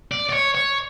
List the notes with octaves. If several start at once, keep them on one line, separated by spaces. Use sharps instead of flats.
D5
D5
C#5
C#5